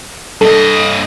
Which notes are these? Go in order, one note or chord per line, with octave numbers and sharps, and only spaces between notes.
G2 A4 D#5